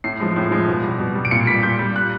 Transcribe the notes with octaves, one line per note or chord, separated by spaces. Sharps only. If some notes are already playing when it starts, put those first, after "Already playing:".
A2 C7
F3 G#3
A2
F3 G#3
B2
G3
B2
G3
D7
A#2 C#7
G3 B6
A#2 G6
G3
F#6